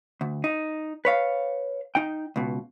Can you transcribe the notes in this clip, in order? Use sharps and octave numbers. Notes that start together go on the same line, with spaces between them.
D2
D#4
B4 C#5 F5
D#4 G5
C#2 B2